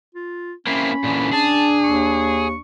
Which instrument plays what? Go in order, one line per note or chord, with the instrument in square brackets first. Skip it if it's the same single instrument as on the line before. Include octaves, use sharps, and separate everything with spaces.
[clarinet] F4
[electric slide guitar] A#3 C4 E4 [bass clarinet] C#4 [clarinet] B5
[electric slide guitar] A#2 D3 E3
[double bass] D4 [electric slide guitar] G#4 [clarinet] A5
[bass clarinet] D#2 [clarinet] C#6